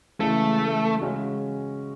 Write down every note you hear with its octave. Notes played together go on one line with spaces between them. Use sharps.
C#3 E3 G#3 A3
C#3 G#3 C#4 F#4